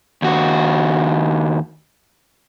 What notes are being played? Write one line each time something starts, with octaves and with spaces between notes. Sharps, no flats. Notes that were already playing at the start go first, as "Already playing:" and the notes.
D#2 F#4